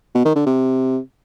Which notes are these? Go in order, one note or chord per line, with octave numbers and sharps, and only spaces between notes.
B2
D#3
D3
C3